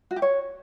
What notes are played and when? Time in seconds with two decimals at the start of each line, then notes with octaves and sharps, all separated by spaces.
0.11 F#4
0.16 G4
0.22 C#5